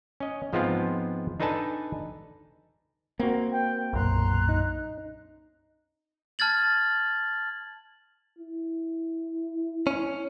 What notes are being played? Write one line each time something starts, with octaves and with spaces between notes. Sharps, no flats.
C#4 D#5
G#2 F3 G#3 B3 C4 F4
D4 D#4 A4 B4 G#5 A5
A#3 C4 F#4
G5
B1 F#2 A#2 A#5 C6 F#6
D#4
A5 F6 G#6 A6 F#7
E4
C#4